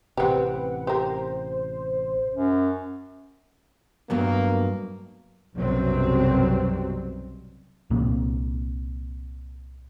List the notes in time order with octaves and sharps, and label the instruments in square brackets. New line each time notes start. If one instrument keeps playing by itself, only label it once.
[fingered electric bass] A1 C3 [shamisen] C4 G4 [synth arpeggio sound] B4 F#5
[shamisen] G4 A#4 [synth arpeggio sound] C5
[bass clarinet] F#2
[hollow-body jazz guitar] G2 F#3 B3 [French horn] A#3
[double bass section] B1 F#2 C3 F#3 G3 C4
[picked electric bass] C2 A#2 A#3 C4